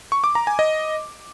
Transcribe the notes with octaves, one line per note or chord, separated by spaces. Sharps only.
C#6
D6
A#5
G#5
D#5